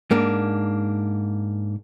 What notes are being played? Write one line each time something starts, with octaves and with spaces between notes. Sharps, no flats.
G#2 A#3 D4